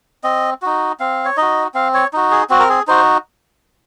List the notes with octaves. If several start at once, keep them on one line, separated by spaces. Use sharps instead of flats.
C4 D#5
D#4 F#4
C4 F5
C#5
D#4 F#4 D#5
C4 F5
C#5
D#4 F#4
G#4
C4 F#4
A#4
G#4
D#4 F#4 C5